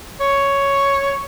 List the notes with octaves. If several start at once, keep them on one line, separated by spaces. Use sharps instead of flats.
C#5